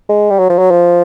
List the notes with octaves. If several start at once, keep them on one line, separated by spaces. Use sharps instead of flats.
G#3
G3
F#3
F3
F#3
F3